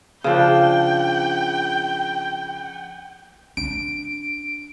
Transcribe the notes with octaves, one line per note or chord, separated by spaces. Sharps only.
C#3 F3 D4 G5
D4 D7